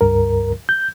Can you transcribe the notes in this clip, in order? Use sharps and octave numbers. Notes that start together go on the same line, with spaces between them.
C#2 G2 A#4
G6